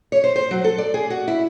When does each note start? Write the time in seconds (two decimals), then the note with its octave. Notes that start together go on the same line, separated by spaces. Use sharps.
0.12 C#5
0.24 C5
0.36 C5
0.51 F#3
0.64 A4
0.78 D5
0.94 G#4
1.10 F#4
1.28 E4